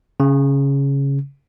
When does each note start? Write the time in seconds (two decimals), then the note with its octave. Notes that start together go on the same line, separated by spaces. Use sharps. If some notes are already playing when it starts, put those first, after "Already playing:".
0.20 C#3